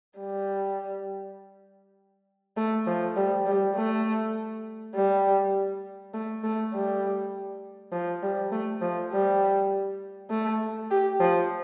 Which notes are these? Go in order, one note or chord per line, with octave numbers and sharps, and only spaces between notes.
G3
A3
F3
G3
G3
A3
G3
A3
A3
G3
F3
G3
A3
F3
G3
A3
G4
F3